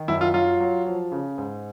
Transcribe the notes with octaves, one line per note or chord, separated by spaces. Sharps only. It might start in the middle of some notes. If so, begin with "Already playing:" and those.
Already playing: D#3
F#2 E4
F4
F#3 F4
F#3
F3
C#3
G#2